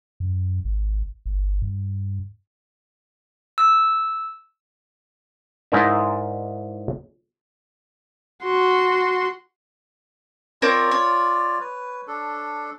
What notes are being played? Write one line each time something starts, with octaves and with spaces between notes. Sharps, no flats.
F#2
G#1
G1
G2
E6
G#2 D#4 E4 A#4 D5 E5
F#4 C6
C4 F4 A#4 C#5 D5
C#5
B4
D4 A4